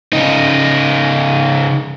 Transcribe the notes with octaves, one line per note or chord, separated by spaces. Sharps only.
C#3 D#4